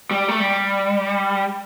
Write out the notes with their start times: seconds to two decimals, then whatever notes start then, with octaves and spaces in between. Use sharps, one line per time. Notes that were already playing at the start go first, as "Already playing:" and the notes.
0.11 G3
0.28 A3
0.40 G3